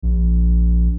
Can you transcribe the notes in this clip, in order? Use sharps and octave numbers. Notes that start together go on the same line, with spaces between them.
A#1